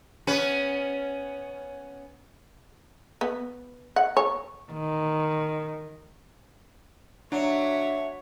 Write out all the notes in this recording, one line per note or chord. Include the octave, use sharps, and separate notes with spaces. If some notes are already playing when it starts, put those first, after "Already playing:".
B3 C#4 B4
B3
F#5
C#5
D#3
F#3 D4 C#5 E5